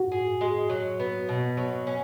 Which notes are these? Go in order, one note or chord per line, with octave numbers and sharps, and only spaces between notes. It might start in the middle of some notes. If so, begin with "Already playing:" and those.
Already playing: F#4
G#4
G#3
F#3
B3
B2
F#3
C#4